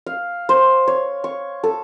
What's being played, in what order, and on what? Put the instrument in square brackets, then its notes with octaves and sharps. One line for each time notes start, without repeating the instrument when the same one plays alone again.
[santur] F5
C5
C#5
C#6
A4